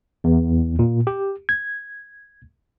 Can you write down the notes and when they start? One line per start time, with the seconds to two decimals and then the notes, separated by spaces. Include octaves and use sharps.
0.24 E2
0.79 A#2
1.07 G4
1.49 G#6